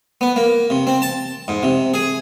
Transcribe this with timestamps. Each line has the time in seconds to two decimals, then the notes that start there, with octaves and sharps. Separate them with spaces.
0.21 B3
0.36 A#3
0.70 C3
0.87 C4
1.02 A5
1.48 G#2
1.63 C3
1.94 G#4